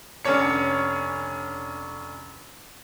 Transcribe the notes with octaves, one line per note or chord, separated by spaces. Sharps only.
F1 C#4 D4 C#5 C#7